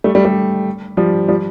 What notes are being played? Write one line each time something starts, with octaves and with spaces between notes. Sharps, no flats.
G3 A3
G3 A3
G3 A3
F3 G3
F3 G3